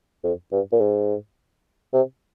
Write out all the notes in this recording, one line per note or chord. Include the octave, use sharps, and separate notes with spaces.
F2
G2
A#2
G#2
C3